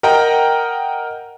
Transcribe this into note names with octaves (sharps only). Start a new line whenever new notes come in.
A#4 D#5 F#5 G5 A#5